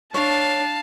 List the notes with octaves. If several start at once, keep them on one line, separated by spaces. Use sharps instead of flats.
D4 C#5 F5 A5